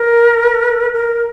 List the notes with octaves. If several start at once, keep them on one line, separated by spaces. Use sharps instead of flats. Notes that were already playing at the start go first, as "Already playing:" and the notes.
Already playing: A#4
A#4